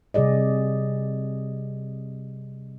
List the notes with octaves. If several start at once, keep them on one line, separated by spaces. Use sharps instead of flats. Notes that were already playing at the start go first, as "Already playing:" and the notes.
C3 G3 G#4 D5 D#5